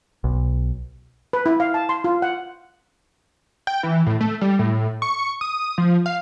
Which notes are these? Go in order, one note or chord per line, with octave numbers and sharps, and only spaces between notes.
B1
B4
E4
F5
A5
C6
F4
F#5
G5
E3
A2
A3
G3
A2
C#6
D#6
F3
F5